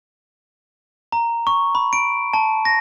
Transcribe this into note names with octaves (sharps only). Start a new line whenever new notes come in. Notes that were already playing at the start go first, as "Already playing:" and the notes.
A#5
C#6
B5
D7
A5
A#6